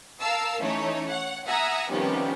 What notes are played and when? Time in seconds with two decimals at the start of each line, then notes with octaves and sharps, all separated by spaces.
0.20 A#4 F5 A5 E6
0.61 E3 A3 C#4 D#4 C#5
1.07 C#5 F#5
1.47 E5 F#5 G#5 A#5 D#6 E6
1.91 C3 D#3 F3 G3 B3 C#4